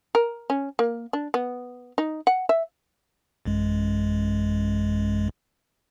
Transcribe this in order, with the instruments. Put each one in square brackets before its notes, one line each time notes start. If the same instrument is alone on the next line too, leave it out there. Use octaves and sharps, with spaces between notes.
[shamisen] A#4
C#4
A#3
D4
B3
D#4
F#5
E5
[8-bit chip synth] A1 F#2 G#3